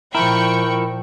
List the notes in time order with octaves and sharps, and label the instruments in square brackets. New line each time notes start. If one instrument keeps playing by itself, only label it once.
[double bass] A#2 F3 [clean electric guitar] E4 [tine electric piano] A#4 A5 A#5 [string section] G5 C#6